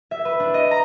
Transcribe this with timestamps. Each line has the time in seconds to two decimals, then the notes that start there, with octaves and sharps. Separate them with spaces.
0.11 E5
0.25 B4
0.40 D4
0.54 D#5
0.71 A#5